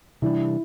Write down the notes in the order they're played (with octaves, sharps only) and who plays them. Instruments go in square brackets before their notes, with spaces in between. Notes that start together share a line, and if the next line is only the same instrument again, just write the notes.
[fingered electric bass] C3 E3 G3 D4 [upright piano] E4